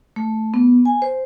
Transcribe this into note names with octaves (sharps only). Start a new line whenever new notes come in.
A3
B3
G#5
C5